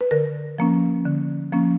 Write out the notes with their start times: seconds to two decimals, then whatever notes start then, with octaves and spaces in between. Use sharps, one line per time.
0.01 B4
0.11 D3 A#4
0.58 F3 A#3 C#4
1.06 D3
1.52 F3 A#3 C#4